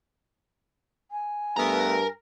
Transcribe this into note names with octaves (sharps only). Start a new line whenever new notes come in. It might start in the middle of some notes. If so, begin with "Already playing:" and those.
G#5
G2 A3 B3 A#4 A#5